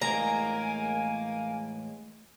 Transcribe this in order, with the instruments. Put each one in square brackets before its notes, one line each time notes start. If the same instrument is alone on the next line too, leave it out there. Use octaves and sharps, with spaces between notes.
[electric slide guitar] E2 A2 G#3 [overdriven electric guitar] A#3 [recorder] G#5 [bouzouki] A#5